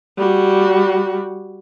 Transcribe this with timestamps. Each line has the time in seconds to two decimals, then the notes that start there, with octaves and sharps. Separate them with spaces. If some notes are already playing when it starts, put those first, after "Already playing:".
0.18 G3 F#4